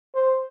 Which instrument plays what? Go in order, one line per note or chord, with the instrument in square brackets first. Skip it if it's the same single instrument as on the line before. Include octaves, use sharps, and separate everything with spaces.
[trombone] C5